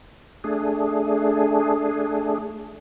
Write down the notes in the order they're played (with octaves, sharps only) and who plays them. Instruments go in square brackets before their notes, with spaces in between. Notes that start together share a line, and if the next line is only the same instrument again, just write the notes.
[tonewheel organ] A3 D4 G#4